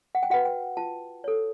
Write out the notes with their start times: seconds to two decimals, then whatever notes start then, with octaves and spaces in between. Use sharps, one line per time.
0.15 F#5
0.23 G5
0.30 F#4 B4 F#5
0.45 G5
0.77 F4 A5
1.24 A4 C#5